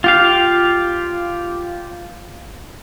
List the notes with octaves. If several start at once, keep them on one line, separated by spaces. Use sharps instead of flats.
F4 G4 F5